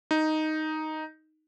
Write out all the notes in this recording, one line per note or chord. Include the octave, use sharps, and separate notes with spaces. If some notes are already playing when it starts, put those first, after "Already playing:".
D#4